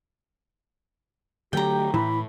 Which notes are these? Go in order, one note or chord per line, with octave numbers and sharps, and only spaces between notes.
D3 F#3 A3 G4 G5 A#5
A2 E3 B5